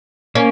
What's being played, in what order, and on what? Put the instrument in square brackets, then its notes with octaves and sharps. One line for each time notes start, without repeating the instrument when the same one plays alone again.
[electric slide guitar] A#3 [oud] C#4